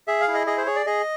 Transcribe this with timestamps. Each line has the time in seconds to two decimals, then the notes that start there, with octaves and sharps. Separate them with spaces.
0.08 G#4 E5
0.21 F5
0.28 E4
0.34 D#5
0.47 G#4 D#5
0.57 C5
0.66 G#4 C#5
0.76 D5
0.86 G#4 D#5